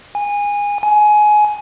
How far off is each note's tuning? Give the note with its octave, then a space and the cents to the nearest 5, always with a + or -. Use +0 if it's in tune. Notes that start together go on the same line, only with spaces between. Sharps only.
G#5 -20
G#5 +20